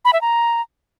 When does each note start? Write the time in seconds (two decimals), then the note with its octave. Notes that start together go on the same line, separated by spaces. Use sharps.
0.05 B5
0.13 E5
0.21 A#5